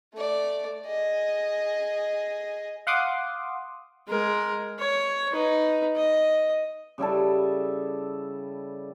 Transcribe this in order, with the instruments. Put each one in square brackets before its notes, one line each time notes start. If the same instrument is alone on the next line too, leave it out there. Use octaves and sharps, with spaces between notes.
[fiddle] A3 D5
G#4 D#5
[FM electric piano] F5 F#5 C6 D6 D#6
[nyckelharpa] G#3 A#4
C#5
D#4 B4
D#5
[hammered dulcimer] C#3 G3 E4 A4